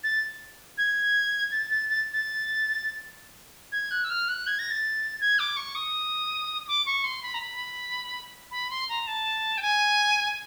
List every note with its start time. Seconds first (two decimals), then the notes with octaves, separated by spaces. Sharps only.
0.03 A6
0.77 G#6
1.51 A6
1.70 A6
1.89 A6
2.13 A6
3.72 G#6
3.90 F#6
4.04 E6
4.09 F6
4.28 F#6
4.47 G#6
4.58 A#6
4.70 A6
5.20 G#6
5.39 D6
5.56 C#6
5.75 D#6
6.67 D6
6.85 C#6
7.04 C6
7.22 B5
7.34 A#5
7.40 B5
8.51 B5
8.70 C6
8.89 A#5
9.07 A5
9.57 G5
9.61 G#5